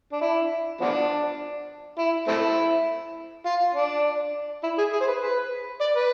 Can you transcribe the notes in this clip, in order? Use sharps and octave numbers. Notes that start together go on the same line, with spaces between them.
D4
E4
F3 B3 D4
E4
A3 C4 E4
F4
D4
E4
G#4
G#4
C5
B4
B4
D5
B4